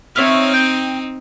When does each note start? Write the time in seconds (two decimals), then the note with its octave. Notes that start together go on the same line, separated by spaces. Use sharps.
0.16 C4 D#4 C#5 E5 F6
0.54 G5